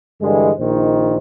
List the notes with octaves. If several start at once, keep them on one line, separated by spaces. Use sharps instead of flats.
G2 D3 E3 G#3
A#1 A#2 D#3 D#4 C5